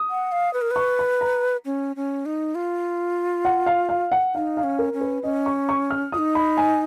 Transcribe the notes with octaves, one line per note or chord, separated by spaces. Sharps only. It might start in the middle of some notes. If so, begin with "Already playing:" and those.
Already playing: D#6
F#5
F5
B4
A#4
B4 C#6
B5
A#5
C#4
C#4
D#4
F4
F#5
F5
F5
F#5
D#4 F5
F5
C#4
A#4
C#4
B4
C#4 D#5
C#6
C#6
F6
F4 D#6
D#4
B5
G#5